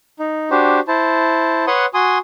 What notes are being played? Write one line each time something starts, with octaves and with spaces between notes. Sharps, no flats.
D#4
D4 F#4 G4 C5
E4 C5 A5
B4 C#5 F#5 C6 D#6
F#4 G#5 C6 D#6